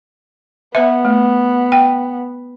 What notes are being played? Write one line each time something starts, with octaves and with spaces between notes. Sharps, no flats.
B3 B4 E5
A3
G5